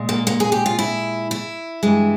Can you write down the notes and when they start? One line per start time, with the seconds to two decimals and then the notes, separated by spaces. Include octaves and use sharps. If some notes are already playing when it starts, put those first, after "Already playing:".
Already playing: A#2 G#3
0.09 A#3
0.27 A#3
0.40 G#4
0.52 G4
0.66 F4
0.79 E4
1.31 E4
1.83 G2 E3 G#3